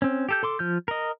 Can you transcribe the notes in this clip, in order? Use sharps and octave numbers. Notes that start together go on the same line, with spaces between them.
C4 C#4
G4 A4 G6
A4 C6 D6
F3 F6 G6
A#4 D#5